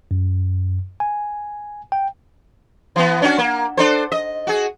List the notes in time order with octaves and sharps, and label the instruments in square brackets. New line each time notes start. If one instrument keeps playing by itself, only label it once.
[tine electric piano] F#2
G#5
G5
[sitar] E3 B3
C#4 D4 F#4
A#3
D4 A4 C5
D#5
F#4 G#4